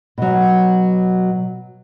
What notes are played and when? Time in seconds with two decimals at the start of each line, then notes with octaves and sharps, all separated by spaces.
0.18 B2 F#3